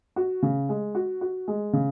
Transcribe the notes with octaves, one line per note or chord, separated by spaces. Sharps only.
F#4
C#3
G#3
F#4
F#4
G#3
C#3